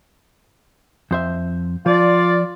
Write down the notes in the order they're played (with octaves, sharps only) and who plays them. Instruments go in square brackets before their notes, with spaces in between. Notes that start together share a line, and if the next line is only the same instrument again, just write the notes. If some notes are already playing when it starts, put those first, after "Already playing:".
[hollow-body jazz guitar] F2 C5 E5
[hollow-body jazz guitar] F3 [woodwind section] F4 D5